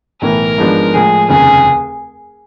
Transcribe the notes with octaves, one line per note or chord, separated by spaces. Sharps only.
B1 A2 E3 A#4
G#2 F3 G#3 B3 D4
A2 F3 G#3 G#4
F1 D#2 C#3 G#4